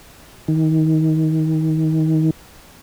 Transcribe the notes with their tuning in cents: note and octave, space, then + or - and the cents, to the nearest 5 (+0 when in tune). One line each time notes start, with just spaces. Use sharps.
D#3 +25